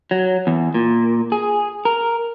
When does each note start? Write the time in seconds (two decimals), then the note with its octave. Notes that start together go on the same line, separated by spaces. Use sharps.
0.11 F#3
0.47 E2
0.74 A#2
1.32 G#4
1.85 A#4